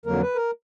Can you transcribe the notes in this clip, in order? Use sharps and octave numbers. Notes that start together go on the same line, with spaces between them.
F2 D3 F#3 A#3 A#4
B4
A#4